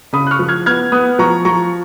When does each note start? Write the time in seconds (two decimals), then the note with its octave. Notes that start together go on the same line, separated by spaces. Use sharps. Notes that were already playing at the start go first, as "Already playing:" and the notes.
0.13 C#3 B5 D#6
0.27 F#6
0.31 C#6 F6
0.39 F3
0.49 F6 G#6
0.66 B3 F6 G#6
0.92 B3 D#6 F#6
1.19 F3 A#5 C#6
1.45 F3 A#5 C#6